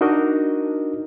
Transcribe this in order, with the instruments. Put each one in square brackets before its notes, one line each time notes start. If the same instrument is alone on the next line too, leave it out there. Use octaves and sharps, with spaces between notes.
[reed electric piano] D4 D#4 F#4 A#4 D#5